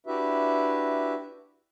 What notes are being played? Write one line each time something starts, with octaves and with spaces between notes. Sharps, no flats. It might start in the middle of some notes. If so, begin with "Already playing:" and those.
D4 E4 F#4 G4 B4 E5